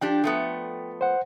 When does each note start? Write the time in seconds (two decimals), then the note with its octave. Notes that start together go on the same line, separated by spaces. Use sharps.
0.01 F3 D4 G4 G5
0.24 F3 A3 B3
1.01 C5 F#5